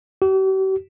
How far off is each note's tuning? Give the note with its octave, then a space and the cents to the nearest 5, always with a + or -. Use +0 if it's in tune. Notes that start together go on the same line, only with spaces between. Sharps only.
G4 -45